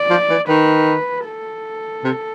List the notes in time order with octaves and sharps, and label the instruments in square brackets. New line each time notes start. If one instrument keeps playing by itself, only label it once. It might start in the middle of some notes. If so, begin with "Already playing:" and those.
Already playing: [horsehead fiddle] D5
[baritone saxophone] F3
E3
[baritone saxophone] D#3 [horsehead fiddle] B4
[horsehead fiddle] A4
[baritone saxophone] C3